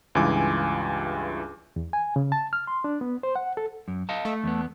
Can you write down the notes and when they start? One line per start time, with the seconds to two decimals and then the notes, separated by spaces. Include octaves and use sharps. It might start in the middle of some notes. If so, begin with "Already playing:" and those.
0.15 C#2 G2 E3 F4 G#5 D6
1.76 E2
1.93 G#5
2.16 C#3
2.32 A5
2.53 F6
2.67 C6
2.84 D4
3.01 B3
3.23 C5
3.36 F#5
3.57 A4
3.88 F#2
4.09 D#5 F5 A5
4.25 A3
4.44 E2 B3